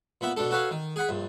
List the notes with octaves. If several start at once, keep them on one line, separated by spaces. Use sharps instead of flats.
A#2 B3 E5 B5
B2 D4 A4
F#4 A4 B4 C#5 F5
D#3
G#4 F#5 B5
A#1 G2